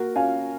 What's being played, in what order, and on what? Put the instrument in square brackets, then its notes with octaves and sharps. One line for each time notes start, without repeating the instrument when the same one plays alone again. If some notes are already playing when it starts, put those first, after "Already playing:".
Already playing: [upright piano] A#3 F#4 A#4
C#4 F5 G#5